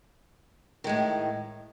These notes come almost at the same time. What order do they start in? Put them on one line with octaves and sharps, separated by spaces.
D#3 G#3 A2